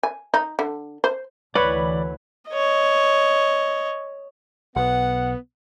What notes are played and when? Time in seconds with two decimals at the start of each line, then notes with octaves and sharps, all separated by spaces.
0.03 G#5
0.34 D#4
0.59 D3
1.04 C5
1.55 D2 E3 B4 C#5 D5 F#5 B5
2.50 C#5 D#5
4.76 B1 B3 F#5